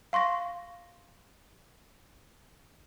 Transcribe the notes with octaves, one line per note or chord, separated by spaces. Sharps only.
F5 C6 C#6 A#6